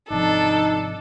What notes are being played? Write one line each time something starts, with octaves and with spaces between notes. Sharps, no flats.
G#1 C3 F3 D4 D#4 A4